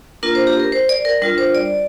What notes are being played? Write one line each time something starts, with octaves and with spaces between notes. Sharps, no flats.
A#3 D4 F4 A#4
C5
G4
A#4
C5
D5
A#4
G3 D4 F4 A#4
C5
D5